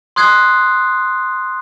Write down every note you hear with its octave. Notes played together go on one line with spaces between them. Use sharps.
C6 D#6 F#6 G#6 C7